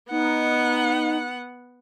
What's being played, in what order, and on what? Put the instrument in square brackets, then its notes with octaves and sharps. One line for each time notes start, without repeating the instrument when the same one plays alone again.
[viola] B3 F#5 [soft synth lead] D#4